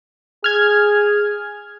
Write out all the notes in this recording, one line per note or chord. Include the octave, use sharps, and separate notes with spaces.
G#4 F6 G#6